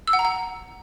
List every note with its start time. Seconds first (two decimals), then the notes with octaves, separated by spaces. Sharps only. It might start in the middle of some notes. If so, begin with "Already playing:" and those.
0.08 E6
0.13 F#5
0.19 A#5
0.25 F#5